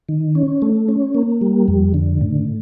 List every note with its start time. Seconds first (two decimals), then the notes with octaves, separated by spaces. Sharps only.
0.09 D#3
0.35 C#4
0.62 A3
0.89 C#4
1.15 A#3
1.41 G3
1.68 F2
1.94 D3
2.21 A2